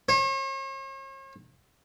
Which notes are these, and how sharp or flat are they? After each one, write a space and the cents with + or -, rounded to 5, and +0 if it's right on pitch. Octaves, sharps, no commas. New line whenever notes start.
C#5 -45